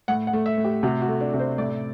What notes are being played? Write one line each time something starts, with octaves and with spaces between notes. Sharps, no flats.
A2 F#5
F#5
A3
E5
A2
G4
C3 F#4
F#4
A3
D4
C3
C5
A2 D5